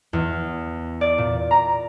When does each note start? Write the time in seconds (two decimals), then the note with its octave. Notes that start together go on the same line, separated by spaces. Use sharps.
0.13 E2
1.01 D5
1.18 A#2
1.51 A#5